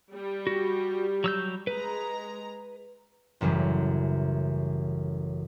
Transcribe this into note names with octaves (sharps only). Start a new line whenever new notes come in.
G3
F#4
F#3 E6 G6
G#3 B4 A#5
A1 F#2 C#3 E3 G3